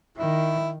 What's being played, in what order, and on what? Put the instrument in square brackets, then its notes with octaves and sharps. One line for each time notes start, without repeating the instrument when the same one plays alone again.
[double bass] D#3 [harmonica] E4